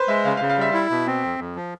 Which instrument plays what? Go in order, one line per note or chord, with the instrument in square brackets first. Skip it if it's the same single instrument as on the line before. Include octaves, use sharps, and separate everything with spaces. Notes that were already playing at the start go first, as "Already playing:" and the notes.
Already playing: [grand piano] B4 C5
[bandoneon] G#3 [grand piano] E5
[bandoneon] C#3 [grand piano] F5
[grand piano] F5
[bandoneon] C#3
[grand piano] F5
[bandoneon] G3 [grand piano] E5
[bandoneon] E4
B2
C4
F2
F2
F3